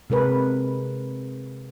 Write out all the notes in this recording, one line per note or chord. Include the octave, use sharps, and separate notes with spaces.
C3 G#3 A#4 B4